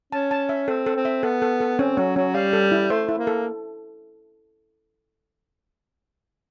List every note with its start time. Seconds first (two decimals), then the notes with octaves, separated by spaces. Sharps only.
0.12 C#4 A5
0.31 A5
0.49 E5
0.68 C4 A4
0.86 A4
0.96 C4
1.05 E5
1.23 B3 A4
1.42 A4
1.61 A4
1.79 C4 C#4
1.98 F#3 C#4
2.16 F#3 C#4
2.35 G3 F5
2.53 A4
2.72 E4
2.90 A3 C5
3.09 E4
3.18 A#3
3.27 A4